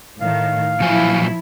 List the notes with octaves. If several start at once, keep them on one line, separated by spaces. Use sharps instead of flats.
A2 D#3 F5
A#2 F3 F#3 E4 G#5